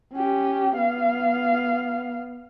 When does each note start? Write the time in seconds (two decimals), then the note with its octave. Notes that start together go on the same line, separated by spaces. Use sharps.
0.14 C#4 G4
0.77 B3 F5